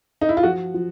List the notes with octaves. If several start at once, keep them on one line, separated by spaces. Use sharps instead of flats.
D#4
E4
F4
F3 F#4
F3